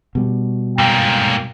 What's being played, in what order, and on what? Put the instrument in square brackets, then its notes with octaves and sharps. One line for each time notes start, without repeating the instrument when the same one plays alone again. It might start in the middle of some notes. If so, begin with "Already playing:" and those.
[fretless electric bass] B2 G3
[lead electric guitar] G#2 A#3 [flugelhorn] G5